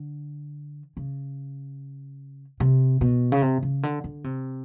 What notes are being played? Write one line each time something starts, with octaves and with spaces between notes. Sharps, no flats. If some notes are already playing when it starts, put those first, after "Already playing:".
Already playing: D3
C#3
C3
B2
C#3
C3
C#3
D3
D3
C3